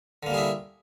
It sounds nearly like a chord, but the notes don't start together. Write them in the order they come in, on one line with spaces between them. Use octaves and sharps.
D3 A#3 G3 G#4 E4